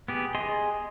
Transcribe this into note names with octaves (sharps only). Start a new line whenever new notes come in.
B3 G4 G#4
G#4 D#5 G#5 C6